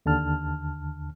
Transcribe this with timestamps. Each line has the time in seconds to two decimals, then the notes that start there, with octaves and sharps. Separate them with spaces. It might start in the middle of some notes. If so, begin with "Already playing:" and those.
0.06 D#2 D3 A5 F6